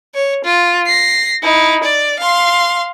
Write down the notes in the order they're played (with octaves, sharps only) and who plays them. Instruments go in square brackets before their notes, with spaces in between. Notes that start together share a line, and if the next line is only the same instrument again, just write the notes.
[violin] C#5
F4
A#6 C7
D#4 E4
D5
F5 C6